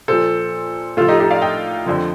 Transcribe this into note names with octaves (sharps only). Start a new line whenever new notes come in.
A#2 F3 A4 C5
A2 F3 F4 A4
D#4 G4
D#4 G4
D5 F5
D#5 G5
F2 D3 F3